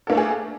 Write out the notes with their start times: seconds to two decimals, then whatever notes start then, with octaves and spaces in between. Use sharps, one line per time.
0.07 A4
0.10 A#3
0.12 A3
0.15 D4
0.17 G#4